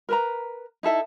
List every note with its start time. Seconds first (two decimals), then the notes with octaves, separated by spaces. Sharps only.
0.09 A#4 B4 A#5
0.83 D#4 E4 A4 E5